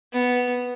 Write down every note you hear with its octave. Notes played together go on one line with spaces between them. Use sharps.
B3